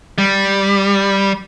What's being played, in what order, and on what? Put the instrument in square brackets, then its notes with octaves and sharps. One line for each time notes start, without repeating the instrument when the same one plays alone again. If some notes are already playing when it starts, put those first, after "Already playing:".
[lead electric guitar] G3